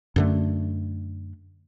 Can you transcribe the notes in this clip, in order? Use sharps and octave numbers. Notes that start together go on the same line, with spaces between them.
F#2 D3 A3